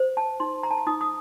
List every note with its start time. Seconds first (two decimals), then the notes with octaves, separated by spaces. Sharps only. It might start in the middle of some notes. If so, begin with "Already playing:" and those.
Already playing: C5
0.17 A5
0.40 D#4 C6
0.63 A#5
0.71 A5
0.77 A#5
0.87 D#4 D#6
1.01 D#6